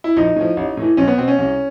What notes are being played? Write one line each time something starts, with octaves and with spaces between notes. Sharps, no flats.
E4
A#1 D#4
A2 F3
A1
A2 E3
B1 C#4
B3
B2 C4
C#4
C2